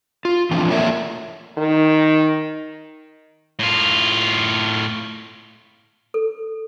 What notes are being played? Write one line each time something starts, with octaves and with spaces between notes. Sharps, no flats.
F4
E3 F3 C4 D4 F4
A3 A#3 D4 A#4 C#5 E5
D#3
A2 F4
A4